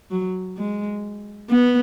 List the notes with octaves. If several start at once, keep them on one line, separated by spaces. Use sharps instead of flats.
F#3
G#3
B3